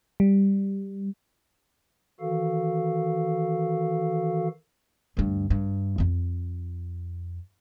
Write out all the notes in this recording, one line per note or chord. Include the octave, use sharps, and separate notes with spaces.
G3
D#3 E3 F#4 A4 F5
D2 G2
G2
F2 F4